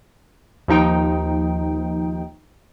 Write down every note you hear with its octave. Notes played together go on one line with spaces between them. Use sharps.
D#2 F3 D#4 G5